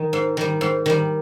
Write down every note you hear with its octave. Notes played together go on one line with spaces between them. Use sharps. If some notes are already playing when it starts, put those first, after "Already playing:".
Already playing: D#3
G#2
D#3 G3
G#2
D#3 G3